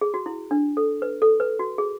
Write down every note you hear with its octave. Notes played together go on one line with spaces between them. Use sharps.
G#4
F#4
E4
D4
A4
B4
A4
B4
F#4
G#4